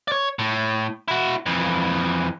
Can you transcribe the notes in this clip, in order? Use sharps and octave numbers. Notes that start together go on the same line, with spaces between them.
C#5 D5
A2
E4 F#4
F2 E3